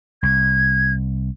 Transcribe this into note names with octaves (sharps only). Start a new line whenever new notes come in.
C2 G#6